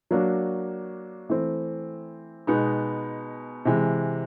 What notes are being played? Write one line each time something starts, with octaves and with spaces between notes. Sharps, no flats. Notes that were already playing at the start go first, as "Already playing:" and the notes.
F#3 A#3 D4 F#4
E3 A3 C4
B2 G#3 B3 D#4
C3 E3 G#3